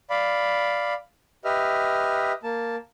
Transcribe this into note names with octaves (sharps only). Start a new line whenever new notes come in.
D5 F5 B5
G4 B4 D#5 E5 F6
A#3 A5